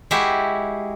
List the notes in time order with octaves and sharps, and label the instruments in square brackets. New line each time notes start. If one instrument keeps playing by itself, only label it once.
[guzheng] G#3 E4 F#4 G4 E5